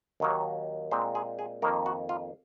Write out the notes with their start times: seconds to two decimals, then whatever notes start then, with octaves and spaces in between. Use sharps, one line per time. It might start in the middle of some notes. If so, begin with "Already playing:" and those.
0.20 D#2 D#3 F#3 A#3
0.91 A#2 G#3 C4 C5
1.15 G#4
1.39 G#4
1.62 F2 D#3 A#3 A#4
1.86 F#4
2.09 F4